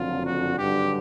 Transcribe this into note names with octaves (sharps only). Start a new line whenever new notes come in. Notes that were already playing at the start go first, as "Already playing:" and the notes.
Already playing: F#1 F2 D3 F#3 F4
F#4
G#1 G2 D3 F#3 G4